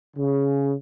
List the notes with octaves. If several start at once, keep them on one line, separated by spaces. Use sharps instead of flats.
C#3